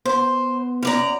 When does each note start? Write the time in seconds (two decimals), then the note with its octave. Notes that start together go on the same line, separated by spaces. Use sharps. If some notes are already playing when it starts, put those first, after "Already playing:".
0.05 B3 C5
0.83 F#2 D5 A#5